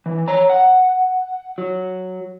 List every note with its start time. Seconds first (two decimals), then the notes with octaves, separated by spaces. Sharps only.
0.06 E3
0.28 C#5 A#5
0.50 F#5
1.58 F#3